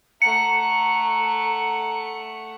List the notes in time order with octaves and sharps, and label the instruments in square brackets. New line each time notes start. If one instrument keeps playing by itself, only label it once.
[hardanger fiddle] A3 F#5 [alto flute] A#5 [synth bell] C#7